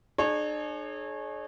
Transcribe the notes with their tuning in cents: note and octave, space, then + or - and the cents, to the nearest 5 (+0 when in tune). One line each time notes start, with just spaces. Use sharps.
D4 +45 G#4 +40 C#5 -20